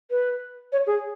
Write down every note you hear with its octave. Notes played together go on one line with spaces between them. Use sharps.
B4
C#5
G#4